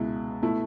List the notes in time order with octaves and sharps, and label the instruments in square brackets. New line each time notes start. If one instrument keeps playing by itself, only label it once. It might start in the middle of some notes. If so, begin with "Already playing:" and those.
Already playing: [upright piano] C#2 B2 G#3 E4
B2 A3 E4